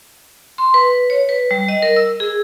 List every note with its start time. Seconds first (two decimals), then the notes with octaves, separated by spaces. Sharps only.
0.58 C6
0.74 B4
1.10 C#5
1.29 B4
1.51 G3
1.68 D#5
1.82 A#4
1.96 E6
2.20 G#4